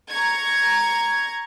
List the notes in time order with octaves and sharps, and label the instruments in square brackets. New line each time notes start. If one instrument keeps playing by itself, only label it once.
[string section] A#5 C#6 G#6